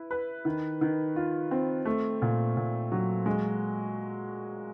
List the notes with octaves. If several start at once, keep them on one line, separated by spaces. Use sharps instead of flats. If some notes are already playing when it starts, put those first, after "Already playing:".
Already playing: E4 B4
B4
D#3
D#3
F4
C4
A3
A#2
A#2
F#3
G#3